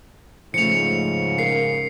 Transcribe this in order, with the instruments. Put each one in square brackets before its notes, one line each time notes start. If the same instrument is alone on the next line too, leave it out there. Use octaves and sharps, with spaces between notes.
[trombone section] G#2 C#3 [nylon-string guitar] F3 A3 [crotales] C#7 F7
[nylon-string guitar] A#4 F5 [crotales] C7